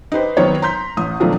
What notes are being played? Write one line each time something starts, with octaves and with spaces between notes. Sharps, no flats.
D#4 G4 B4 C5
D#3 F#3 B3 C4 C5 C#5
A#5 C6 G6 B6
A1 D#6
B2 D#3 F3 F#3 A3 D4